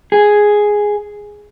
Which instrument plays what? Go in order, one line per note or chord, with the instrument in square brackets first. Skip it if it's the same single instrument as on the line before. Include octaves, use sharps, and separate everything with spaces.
[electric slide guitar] G#4